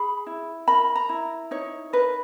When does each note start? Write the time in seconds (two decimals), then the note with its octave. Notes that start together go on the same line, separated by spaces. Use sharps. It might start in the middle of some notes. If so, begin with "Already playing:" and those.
Already playing: G#4 B5
0.27 E4
0.68 A#4 B5
0.95 A#5
1.09 E4
1.51 D#4 C#5
1.93 A#4 B4